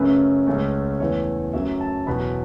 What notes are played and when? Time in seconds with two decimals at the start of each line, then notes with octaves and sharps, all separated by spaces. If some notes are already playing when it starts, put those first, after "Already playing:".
Already playing: F#2 C#3 A3 C#4 B4
0.47 C#2 C#3 A3 C#4
1.00 E2 E3 A3 C#5
1.53 F#2 F#3 A3 E5
1.81 A5
2.07 E2 B2 F#3 B5